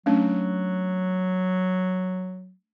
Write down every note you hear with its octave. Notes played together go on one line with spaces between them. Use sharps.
F#3 A3 C#4 D4